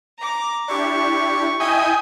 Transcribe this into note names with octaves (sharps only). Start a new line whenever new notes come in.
A#5 D6
D4 E4 G4 C#6
E4 D#5 E5 G5 G#5 D#6